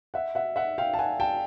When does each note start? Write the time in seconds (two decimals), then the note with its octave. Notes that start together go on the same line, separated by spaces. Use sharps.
0.14 E5 F#5
0.35 E5 F#5
0.56 E5 F#5
0.78 F5 G5
0.94 A5
0.99 F#5 G#5
1.20 G5 A5